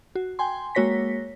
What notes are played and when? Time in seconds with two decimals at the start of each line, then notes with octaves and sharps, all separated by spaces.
0.15 F#4
0.39 G5 G#5 C6
0.75 G#3 A#3 F#4 C#5 A#6 B6